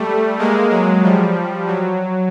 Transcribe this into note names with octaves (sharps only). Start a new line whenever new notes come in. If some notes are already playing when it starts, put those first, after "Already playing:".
Already playing: G3 A3
G#3 A#3
F#3 G#3
F3 G3
F#3